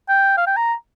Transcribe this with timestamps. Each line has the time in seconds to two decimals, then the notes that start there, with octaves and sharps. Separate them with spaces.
0.09 G5
0.37 F5
0.47 G5
0.56 A#5